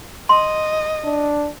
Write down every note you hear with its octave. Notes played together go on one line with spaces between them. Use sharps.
D#5 C6
D4